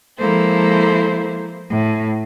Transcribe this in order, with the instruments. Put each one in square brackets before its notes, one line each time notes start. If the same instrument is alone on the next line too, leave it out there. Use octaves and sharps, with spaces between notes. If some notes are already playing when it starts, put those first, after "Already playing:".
[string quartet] F3 G#3 A#3 E4 A4 C5
A2